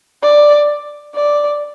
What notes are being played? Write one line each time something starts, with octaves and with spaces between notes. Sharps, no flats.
D5
D5